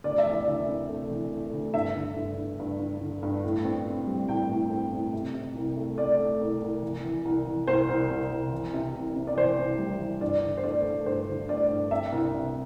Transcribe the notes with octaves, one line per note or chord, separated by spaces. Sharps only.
D2 D5
E5
E3
D5
D2 E5
C3
A3
E3
A3
D2
G2 E5
D3
G2
G2
G2
G2
D3
G2
A2
C4
C4
G3
A2 G5
A2
C4
A2
C3
C3
C2
A3
A3 D5
A3
C2
C2
E3
E3
C2
E3
C2 C5
C2
C2
C2
E3
C3
C2
C3
D5
E3 C5
C2
G3
E3
G2 D5
D3
C5
A3 D5
A3
G2 C5
D3
A3 D5
G2
C4 E5
C2
C3